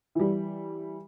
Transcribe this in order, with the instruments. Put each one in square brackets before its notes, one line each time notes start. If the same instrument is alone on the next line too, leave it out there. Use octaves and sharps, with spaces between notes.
[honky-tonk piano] E3 G3